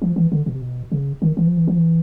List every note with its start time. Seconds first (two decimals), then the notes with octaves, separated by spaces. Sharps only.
0.02 F3
0.16 E3
0.32 D3
0.46 B2
0.55 C3
0.62 B2
0.92 C#3
1.22 D#3
1.37 E3
1.47 F3
1.57 E3
1.67 F3
1.77 E3